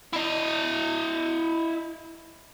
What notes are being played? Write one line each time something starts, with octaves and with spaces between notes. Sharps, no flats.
E4 D#5